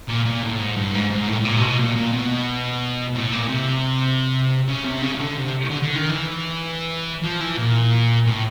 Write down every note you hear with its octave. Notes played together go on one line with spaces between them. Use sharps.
A#2
A#2
A2
G#2
G2
G#2
G#2
A2
A2
A#2
C3
B2
A#2
A#2
B2
A2
A#2
C3
C#3
C3
C#3
C#3
D3
C3
D3
D3
D#3
E3
F3
E3
A#2
A2